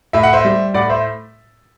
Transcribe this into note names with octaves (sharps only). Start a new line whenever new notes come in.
A2 E5
F#5
C5 E5
G3
A2 D5 F#5
C5 E5